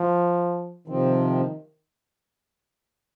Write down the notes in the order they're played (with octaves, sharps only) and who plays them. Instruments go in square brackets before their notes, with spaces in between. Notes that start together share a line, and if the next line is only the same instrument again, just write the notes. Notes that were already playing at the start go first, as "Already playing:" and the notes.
Already playing: [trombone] F3
[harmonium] C3 F3 C4 [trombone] D#3